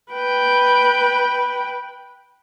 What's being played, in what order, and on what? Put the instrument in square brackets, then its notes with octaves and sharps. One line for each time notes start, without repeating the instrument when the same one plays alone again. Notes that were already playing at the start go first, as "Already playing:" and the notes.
[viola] B4 G5